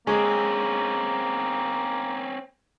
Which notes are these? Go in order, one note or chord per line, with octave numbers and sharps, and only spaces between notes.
G#3 A#3 C4 C#4